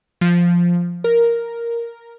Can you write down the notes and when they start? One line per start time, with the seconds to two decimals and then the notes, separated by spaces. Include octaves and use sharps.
0.21 F3
1.04 A#4